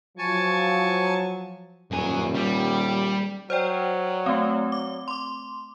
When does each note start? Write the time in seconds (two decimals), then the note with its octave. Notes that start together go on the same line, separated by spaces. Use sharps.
0.18 F3 F#3 G#5 A5 C#6
1.91 D#1 F#2 G#5
2.35 G3
3.50 F#3 C5 D5 G5
4.26 A3 C4
4.72 D6
5.08 C6 D6